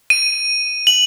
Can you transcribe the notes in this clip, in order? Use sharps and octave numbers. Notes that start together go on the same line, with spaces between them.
D#7
F#7